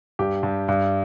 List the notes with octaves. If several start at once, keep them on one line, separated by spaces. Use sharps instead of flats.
G2 G4
G2
G2